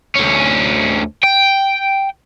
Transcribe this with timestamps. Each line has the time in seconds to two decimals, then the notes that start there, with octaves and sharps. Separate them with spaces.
0.16 D2 C#4
1.23 G5